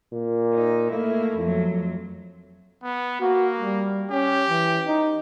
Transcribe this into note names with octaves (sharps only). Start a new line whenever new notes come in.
A#2
D#4
A3 A#3 E4
F2 F#3
B3
A#3 F#4
G3
C#4 G4
E3
D#4